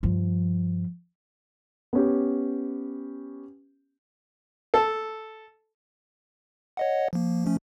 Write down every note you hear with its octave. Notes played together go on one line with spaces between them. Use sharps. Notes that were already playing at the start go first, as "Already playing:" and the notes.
G2 F3
B3 C#4 G4
A4
C#5 D#5 F#5
F3 A#3
F3 A3 C#4